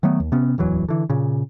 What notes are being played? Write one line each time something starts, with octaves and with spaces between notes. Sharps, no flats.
D#3 F#3 A3 B3
D#2
C3 B3 C#4
D1 E2 E3 F#3
D3 E3
A#2 C#3